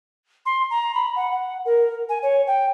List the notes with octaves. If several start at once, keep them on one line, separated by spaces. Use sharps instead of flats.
C6
A#5
B5
F#5
F#5
A#4
G#5
C#5
G5